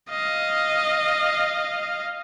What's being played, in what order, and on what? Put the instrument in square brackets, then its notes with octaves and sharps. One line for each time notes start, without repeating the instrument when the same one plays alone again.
[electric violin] D#5 F5